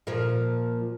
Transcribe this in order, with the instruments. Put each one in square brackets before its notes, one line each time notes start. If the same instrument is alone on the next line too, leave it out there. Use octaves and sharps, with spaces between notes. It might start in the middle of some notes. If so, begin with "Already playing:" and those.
[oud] A#2 F3 A#3